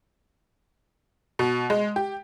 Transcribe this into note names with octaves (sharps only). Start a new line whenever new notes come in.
B2
G#3
G4